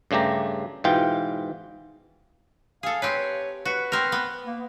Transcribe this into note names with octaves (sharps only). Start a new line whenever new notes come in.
G2 C#3 A3 G4 A#5
G#2 B2 E3 F4 G5
G#4 A4 F5
C4 G4 B4 C#5
F#4 B4
C4 A#4
B3
A#3